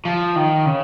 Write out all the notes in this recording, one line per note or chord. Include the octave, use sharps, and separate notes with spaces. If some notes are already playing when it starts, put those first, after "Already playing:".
F3
D#3
C#3